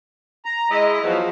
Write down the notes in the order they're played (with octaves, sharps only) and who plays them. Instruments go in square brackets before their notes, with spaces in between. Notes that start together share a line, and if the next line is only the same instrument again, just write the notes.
[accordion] A#5
[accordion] G#3 [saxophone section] E4 D#5
[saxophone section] E2 F#3 [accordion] F3